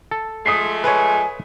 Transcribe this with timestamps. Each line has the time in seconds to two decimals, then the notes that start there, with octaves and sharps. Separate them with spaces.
0.11 A4
0.46 F3 G#3 A3 D#6 B6 C7
0.84 B4 C#5 G#5